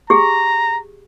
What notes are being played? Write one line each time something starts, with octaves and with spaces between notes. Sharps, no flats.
G4 G#4 A#5